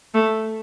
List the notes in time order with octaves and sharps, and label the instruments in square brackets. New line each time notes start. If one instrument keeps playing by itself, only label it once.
[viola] A3